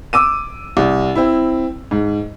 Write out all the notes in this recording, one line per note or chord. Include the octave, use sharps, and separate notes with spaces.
D6 E6 D#7
C2
C4 E4
G#2